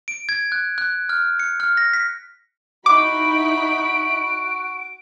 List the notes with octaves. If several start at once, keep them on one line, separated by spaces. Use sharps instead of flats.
D7
G#6
F#6
F#6
F6
C#7
F6
A#6
B6
D#4 E4 F#4 B5 D6 D7